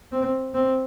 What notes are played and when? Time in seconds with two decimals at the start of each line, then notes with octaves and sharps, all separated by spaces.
0.12 C4
0.54 C4